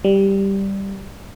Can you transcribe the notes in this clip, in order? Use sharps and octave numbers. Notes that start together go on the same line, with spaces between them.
G3